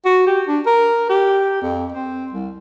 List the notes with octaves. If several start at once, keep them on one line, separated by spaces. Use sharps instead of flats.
F#4
G4
D4
A#4
G4
F2
C4
C2